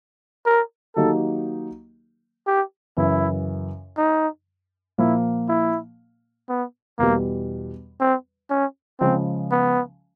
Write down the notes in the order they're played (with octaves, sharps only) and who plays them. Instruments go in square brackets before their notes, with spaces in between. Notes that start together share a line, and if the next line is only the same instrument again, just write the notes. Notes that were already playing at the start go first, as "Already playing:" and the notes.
[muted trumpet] A#4
[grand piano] D#3 F#3 A#3 D#4 G4 [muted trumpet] A4
[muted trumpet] G4
[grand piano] F#2 C#3 E3 [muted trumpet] E4
[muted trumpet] D#4
[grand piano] A#2 F3 A#3 [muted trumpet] E4
[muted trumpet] E4
B3
[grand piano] E2 B2 G3 [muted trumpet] A#3
[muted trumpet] C4
C#4
[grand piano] C#3 F3 G#3 [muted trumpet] C4
[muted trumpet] B3